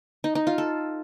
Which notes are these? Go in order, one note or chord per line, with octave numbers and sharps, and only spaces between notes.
D#4
D#4
F4
A4